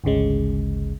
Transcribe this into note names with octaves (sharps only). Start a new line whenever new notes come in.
G#1 D2 C#3 G#3